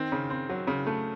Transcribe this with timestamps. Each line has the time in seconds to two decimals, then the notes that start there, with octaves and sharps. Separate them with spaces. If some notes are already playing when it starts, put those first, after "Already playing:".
Already playing: D#3 C4
0.12 C#3
0.30 C4
0.49 F#3
0.67 C#3
0.87 A3